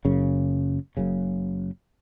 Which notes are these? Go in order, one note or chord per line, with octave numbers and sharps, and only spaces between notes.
F#1 F#2 C#3
F#1 F#2 C#3